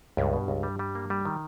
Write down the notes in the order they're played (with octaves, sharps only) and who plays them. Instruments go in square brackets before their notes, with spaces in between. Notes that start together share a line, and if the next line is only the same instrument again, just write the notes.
[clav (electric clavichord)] C#2 [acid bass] G2
[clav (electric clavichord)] B2
C#2
G3
G3
A#3
G3
D#3